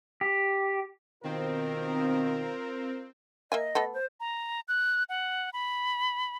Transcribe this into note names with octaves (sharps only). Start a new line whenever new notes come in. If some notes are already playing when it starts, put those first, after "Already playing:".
G4
B2 D#3 C4 F4 A#4
A#3 D#5 E5 G#5
A3 B3 A4
C5
A#5
F#6
F#5
B5